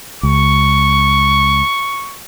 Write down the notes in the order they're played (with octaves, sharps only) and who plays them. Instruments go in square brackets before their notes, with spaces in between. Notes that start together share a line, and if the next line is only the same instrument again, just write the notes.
[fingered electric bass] C#2 [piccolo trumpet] C#6